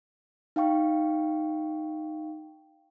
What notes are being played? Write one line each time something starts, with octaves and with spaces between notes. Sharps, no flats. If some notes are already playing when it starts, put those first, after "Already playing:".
D#4 F5 G5 C#6